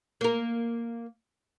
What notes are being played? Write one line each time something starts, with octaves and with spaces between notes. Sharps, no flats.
A#3 A#4